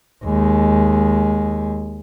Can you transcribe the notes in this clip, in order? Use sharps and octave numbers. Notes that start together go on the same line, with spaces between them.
D#2 G#3